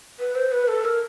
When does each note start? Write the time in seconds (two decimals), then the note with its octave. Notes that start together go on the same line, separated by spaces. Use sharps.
0.19 B4
0.35 C5
0.52 B4
0.68 A4
0.84 A#4